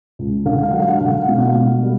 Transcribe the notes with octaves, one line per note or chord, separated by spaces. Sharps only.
C#2
D3 F5
F#5
F5
F#3 F#5
F5
F#5
D3 F5
F#5
F5
F#5
B2 F5
F#5
F5
B2
G3